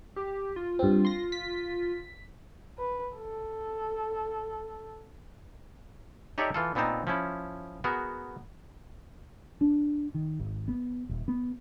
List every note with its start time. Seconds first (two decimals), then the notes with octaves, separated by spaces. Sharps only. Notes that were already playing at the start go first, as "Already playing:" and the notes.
0.16 G4
0.56 F4
0.79 G2 C4
1.05 C6 A#6
1.32 B6
2.78 B4
3.16 A4
6.38 D#4 G4 A4 C#5 D5 E5
6.54 E3 F4 A4
6.75 A#2 B3 C4 D#4 A5
7.07 F3 C#4 E4
7.84 B3 F#4 G#4 A#4
9.61 D4
10.14 D#3
10.40 G#1
10.68 B3
11.09 D#1
11.28 B3